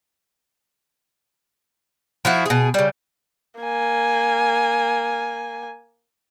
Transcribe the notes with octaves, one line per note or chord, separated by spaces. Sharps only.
F3 E4 F#4
B2 G#4
C#3 G3
A#3 G#5